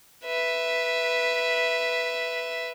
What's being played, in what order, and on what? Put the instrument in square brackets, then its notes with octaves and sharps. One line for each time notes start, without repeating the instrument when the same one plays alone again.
[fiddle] B4 E5